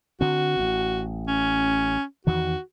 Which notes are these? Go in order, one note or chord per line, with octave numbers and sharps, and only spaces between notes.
D3 C4 F#4
A1
C#4
E2 D#3 E3 F#4